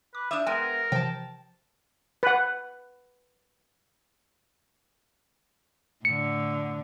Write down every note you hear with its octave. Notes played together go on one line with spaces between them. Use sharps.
B4 D6
D4 E5 D6 D#6 G6 E7
G#3 B3 A#4 G5
C3 E3 F3 G5 A5
B4 F#5
A2 D3 C#7